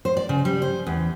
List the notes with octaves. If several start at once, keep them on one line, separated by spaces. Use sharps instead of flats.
C5
D5
C#3
G3
C5
E2